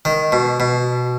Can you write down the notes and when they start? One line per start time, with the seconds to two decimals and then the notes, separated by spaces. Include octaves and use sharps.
0.05 D#3
0.32 B2
0.60 B2